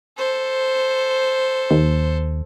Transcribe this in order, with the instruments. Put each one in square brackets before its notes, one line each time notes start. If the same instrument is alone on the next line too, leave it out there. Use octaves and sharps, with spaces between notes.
[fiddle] A4 C5
[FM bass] D#2